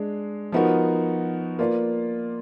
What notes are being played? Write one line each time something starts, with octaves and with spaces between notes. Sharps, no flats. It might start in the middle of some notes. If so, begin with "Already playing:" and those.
Already playing: G#3 D4 G#4
F3 B3 D#4 F#4 A#4
A#3 F4 B4 D5